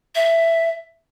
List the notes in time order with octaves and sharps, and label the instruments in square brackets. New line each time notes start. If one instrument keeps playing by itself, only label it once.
[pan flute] E5